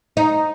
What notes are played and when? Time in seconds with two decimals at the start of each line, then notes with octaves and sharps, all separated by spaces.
0.17 D#4